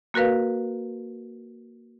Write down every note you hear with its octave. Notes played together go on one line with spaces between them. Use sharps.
A#3 F#4 A#4 B4 F5